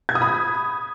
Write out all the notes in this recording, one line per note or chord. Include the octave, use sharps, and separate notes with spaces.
G#6
D#6
B5